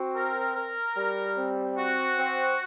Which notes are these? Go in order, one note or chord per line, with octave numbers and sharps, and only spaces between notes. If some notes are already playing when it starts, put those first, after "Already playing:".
Already playing: C4 F#4
A#4
A#4
G3
C4
F#4
C4